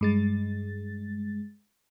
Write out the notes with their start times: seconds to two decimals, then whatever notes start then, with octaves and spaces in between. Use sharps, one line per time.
0.01 G2 G#3 A6